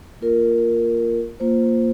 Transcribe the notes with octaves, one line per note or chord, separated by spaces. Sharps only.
A#3 F4 A#4
A#3 F4 C5